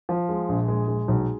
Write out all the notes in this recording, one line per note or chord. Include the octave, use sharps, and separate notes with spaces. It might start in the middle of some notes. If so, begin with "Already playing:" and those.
F3
G#3
A#1
G#3
G#3
B1